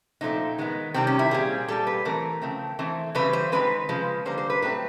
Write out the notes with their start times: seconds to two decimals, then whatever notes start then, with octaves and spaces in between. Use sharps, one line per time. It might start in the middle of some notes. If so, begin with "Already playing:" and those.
0.21 A#2 F3 A3 C4 D#4
0.58 D#3 G#3 B3
0.94 C3 D#3 G3 C4
1.07 C#4
1.19 E4
1.31 A#2 G3 C4 G#4
1.68 A#2 G3 C4 A4
1.87 B4
2.05 E3 A3 C4 A#4
2.42 C#3 F3 A3 C4
2.79 E3 A3 C4
3.15 C#3 E3 G3 C4 B4
3.33 C5
3.52 D#3 G#3 C4 B4
3.89 C#3 F3 G#3
4.25 D3 G3 A#3 C5
4.38 C5
4.50 B4
4.62 A2 F#3 A3 C4 B4